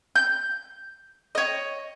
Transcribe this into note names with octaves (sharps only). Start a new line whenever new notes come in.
G6
C#5 D#5